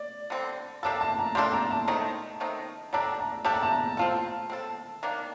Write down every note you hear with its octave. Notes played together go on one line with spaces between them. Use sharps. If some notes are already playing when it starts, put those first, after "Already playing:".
Already playing: D5
D3 G3 C4
G3 A#3 D4 A4 A5
A5
A#5
G3 A#3 D4 A4 C6
A#5
A5
D#3 A3 C4 D#4
D#3 A3 C4 D#4
G3 D4 A4 A#5
A#5
G3 D4 A4 A5
A#5
A5
A#5
C4 F4 A4 A5
C4 F4 A4
D#3 A#3 D4